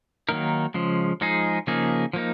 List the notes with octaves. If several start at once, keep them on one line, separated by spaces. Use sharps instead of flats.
D#3 F#3 A#3 D#4 A#4
C#3 F3 G#3
F3 G#3 D#4 G#4
C#3 F3 A#3 D#4 G#4
F3 A#3 D#4